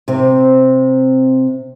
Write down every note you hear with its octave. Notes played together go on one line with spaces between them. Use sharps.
C3 C4